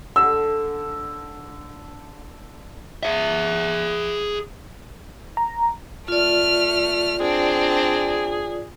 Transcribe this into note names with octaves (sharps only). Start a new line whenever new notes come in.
D3 E6
G#4 E5
A#5
A3 F4 D5 F6
C4 D4 G#4